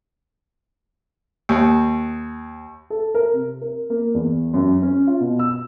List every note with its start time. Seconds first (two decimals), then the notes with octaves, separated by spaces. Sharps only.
1.49 D#2
2.90 A4
3.15 A#4
3.33 C3
3.61 A#4
3.90 A#3
4.15 E2
4.54 F#2
4.82 C#4
5.07 F4
5.20 B2
5.39 E6